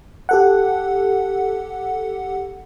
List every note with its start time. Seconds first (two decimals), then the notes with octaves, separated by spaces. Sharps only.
0.29 G4 A4 F#5